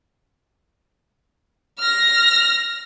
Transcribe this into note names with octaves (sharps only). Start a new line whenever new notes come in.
F6 A#6